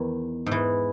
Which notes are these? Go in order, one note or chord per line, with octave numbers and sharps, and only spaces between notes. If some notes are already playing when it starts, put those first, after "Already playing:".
Already playing: E2 D#3
G#2
E3